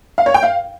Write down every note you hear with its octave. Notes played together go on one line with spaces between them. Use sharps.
F5
C#5
G5
F5